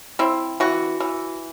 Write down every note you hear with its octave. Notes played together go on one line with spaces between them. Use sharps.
C4 E4
E3 F#4
E3